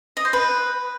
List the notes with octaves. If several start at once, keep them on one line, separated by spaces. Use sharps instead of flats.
D#5
C5
B4